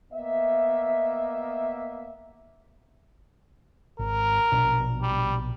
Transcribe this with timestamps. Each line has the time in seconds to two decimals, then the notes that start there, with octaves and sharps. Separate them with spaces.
0.13 A#3 B3 D#5 E5
3.99 G#1 A#4
4.52 A#1 B2 D4
5.02 G3